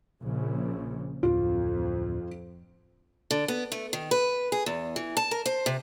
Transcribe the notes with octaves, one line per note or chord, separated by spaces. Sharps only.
A#1 C#3
D1 F2 F4
D3
B3
A3
D#3
B4
G#4
E2
E3
A5
A#4
C5
C3